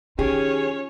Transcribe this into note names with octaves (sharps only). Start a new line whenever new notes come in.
D#3 C#4 F4 G4 G#4 C#5